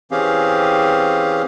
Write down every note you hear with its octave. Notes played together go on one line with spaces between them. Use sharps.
E3 C4 C#4 G4 G#4 F5